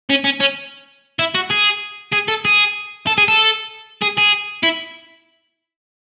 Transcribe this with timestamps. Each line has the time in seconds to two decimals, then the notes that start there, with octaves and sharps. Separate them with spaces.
0.10 C#4
0.24 C#4
0.40 C#4
1.19 E4
1.35 F#4
1.50 G#4
2.13 G#4
2.28 A4
2.45 G#4
3.07 A4
3.18 G#4
3.28 A4
4.02 G#4
4.17 G#4
4.63 E4